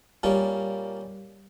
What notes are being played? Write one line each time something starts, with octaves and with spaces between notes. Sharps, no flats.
A#2 G3 A#3 C#4